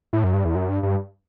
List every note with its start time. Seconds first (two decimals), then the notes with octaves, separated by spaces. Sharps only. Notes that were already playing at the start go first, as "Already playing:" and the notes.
0.13 A2
0.24 F#2
0.34 G2
0.45 E2
0.55 F#2
0.69 G2
0.83 G2